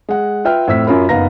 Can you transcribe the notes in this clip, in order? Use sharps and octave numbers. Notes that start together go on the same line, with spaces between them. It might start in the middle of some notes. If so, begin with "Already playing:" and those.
G#3 F#5
F4 B4 E5 G5 F6
F2 A2 C5 E5 E6 B6
F#2 C#4 F4 A#4 B5
F#1 B3 D#4 F5 A#5 A#6